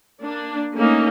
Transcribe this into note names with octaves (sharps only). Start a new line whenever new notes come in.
A#3 D4
A3 A#3 C#4 D#4